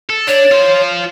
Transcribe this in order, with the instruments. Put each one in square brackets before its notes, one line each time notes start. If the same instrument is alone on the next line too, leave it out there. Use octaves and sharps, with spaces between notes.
[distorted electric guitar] A4
[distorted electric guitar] D4 [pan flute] C#5
[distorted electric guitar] F4 C5